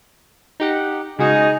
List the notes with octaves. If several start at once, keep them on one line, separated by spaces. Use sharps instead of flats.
D#4 G4 F#5
C#3 G#3 D#4 F#4 G#4